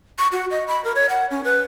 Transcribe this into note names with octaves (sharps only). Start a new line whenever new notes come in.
C#6
F#4
D#5
B5
A#4
C#5
F#5
C#4
B4